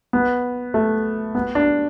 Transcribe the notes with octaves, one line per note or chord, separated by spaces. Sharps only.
B3
A3
B3
D4